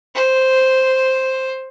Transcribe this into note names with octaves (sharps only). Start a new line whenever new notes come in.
C5